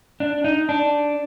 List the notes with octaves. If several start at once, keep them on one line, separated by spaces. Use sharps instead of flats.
D4
D#4
D4